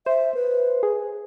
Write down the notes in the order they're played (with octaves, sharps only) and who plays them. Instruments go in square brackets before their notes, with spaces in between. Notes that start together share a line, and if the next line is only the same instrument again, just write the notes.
[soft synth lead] C5 [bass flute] E5
[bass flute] B4
[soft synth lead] G#4